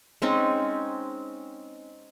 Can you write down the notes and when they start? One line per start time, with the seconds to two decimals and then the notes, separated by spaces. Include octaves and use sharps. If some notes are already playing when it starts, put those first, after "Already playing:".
0.22 G#3 C4 C#4 D#4